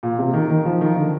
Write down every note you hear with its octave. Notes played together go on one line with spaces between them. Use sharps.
A#2
C3
D#3
D#3
F3
D#3
D3